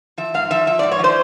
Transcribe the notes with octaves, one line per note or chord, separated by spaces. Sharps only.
F3 E5
G#2 F5
F3 E5
F3 E5
G#2 D5
C#5
F3 C5